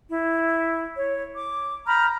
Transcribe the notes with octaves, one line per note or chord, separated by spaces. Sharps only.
E4
C#5
D6
A#5 B5 F6 G6